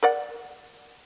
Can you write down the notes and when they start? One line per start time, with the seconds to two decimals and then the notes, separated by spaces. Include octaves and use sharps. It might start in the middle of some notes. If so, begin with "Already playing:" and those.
0.03 A#4 D5 F#5